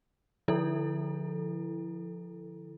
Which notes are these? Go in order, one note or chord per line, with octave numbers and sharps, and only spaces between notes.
D3 F3 E4 A4